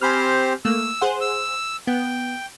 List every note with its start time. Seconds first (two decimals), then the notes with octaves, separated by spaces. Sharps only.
0.01 C4 G4 C5 G#5 B5 F6
0.65 A3 A#3 E6
1.01 G#4 C5 F#5
1.21 E6
1.87 B3 G5